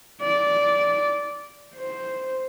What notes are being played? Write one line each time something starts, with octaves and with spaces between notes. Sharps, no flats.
D5
C5